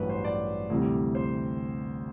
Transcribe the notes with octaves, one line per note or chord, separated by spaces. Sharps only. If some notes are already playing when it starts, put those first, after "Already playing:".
Already playing: A1 G2 F#3 B4
C5
D5
D2 C3 E3 G3
C5